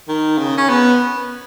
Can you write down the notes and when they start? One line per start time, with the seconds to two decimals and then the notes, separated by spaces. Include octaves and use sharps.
0.08 D#3
0.38 C#3
0.57 C#4
0.69 B3